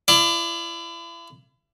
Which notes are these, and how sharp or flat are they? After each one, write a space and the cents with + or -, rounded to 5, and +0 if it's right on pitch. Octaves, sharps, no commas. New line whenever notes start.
E4 +40 D5 +10